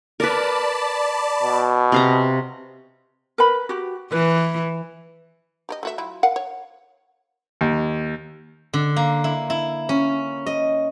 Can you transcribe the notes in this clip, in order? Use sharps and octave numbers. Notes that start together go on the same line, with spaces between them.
A#4 B4 D5 A5 B5
B2
C3 F5 A#5
A#4 B4 B5
F#4 G4
E3 B4
G4 A#4 D#5
A3 F#4 E5
F#3 E4 F4
A#4 F5 F#5
C#5
D#2
D3
A#3
E4
E4
C#4
D#5